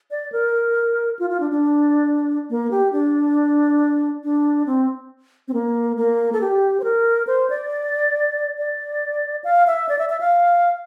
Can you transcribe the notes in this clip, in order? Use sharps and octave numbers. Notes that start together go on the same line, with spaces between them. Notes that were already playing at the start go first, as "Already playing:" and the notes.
D5
A#4
F4
F4
D4
D4
A#3
G4
D4
D4
C4
C4
A#3
A#3
A4
G4
C5
A#4
C5
D5
D5
F5
E5
D5
E5
E5
F5